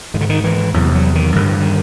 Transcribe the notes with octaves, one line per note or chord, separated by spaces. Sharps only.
G#2 D#3
D3
D#3
E3
E2 C3 F#3
F#3
D#3
G2 D3 D#3
E3
D#3